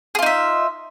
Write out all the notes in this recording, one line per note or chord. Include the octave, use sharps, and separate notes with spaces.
D#4 F4 G#4 E5